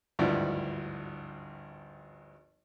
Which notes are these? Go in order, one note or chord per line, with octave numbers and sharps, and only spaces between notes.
G#1 D2 G2 F3 E4 D5